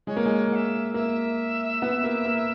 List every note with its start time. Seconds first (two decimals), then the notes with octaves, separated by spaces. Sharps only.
0.07 G#3 C#5
0.17 A#3
0.25 G#3
0.52 F#5
0.55 E5
0.94 A#3 E5
1.82 B3
2.04 A#3
2.26 A#3